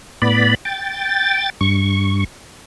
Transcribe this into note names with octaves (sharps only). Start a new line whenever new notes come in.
A2 B3 D5 B5
G5 A6
G2 C#6